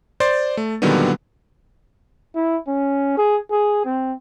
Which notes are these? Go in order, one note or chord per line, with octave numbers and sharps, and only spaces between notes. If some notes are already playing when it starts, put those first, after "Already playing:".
C5 D5 C6 A6
A3
A#2 D3 D#3 F#3 G3 B3
E4
C#4
G#4
G#4
C4